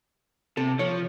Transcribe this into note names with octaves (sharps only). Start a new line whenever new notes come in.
C3 A4
F3 C#5